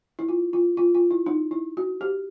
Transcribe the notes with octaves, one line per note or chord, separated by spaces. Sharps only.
E4
F4
F4
F4
F4
E4
D#4
E4
F#4
G4